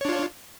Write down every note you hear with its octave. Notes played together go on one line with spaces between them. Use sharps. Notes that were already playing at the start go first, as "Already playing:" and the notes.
D4 F4 C#5